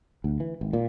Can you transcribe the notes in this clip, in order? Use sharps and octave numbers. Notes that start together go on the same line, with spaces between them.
D2
E3
G#1
A#2